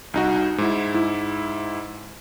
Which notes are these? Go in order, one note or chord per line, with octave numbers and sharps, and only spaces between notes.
C2 D#4 F#4
G#2 E4
G#2 E4